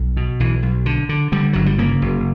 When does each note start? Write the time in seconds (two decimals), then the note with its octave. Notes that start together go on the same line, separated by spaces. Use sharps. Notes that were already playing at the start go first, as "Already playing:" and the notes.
Already playing: B1
0.17 B2
0.40 B1 E3
0.63 B1
0.86 D3
1.09 D3
1.32 D3 G3
1.53 G1 F#3
1.66 G3
1.79 C#3 A#3
2.02 F#1